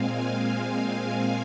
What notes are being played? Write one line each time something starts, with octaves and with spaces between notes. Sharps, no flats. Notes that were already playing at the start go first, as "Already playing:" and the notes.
Already playing: A#2 G#3 C4 F5 G#5
F5
F5